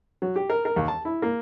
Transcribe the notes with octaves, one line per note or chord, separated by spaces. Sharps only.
F#3
G4
A#4
A#4
D#2
A5
E4
A#3